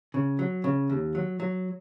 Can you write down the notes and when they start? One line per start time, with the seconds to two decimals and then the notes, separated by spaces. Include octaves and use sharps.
0.14 C#3
0.39 F#3
0.64 C#3
0.90 D#2
1.15 F#3
1.40 F#3